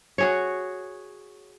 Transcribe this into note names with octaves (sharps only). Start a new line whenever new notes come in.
F#4 G#4 C#5